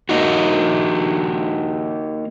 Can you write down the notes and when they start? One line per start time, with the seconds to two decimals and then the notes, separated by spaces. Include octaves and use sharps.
0.09 A#3 D#4 F#4